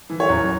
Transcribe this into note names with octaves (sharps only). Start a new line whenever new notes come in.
E3
C#5
F#2